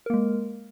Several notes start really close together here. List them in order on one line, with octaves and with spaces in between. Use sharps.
A#4 A#3 G#3